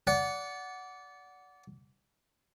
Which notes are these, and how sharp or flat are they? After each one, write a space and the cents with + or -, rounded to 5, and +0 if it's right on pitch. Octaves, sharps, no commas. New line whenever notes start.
D5 -25 F#5 +0